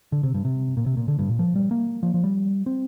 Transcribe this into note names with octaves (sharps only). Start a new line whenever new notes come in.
D3
C3
G2
C3
A#2
C3
A#2
D3
G2
A#2
F3
G3
A#3
F3
F3
G3
C4